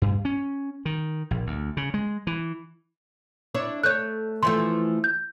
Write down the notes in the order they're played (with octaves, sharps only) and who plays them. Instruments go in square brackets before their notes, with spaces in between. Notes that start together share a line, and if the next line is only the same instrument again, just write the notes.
[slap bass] G2
C#4
D#3
A#1
D2
C#3
G#3
E3
[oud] D4 E4 C#5
[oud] A3 C#5 [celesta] F#6 G6
[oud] E3 F3 A3 [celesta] C6
[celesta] G6